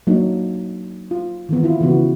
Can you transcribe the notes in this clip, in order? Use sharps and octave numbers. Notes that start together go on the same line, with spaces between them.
F#3 A#3 D4 D#4
F4
D#3 E3 B3
B3 E4 F4
C#3 E3 B3 F#4